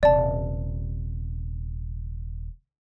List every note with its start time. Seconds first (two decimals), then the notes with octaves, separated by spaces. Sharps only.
0.03 D#1 C3 D5 A5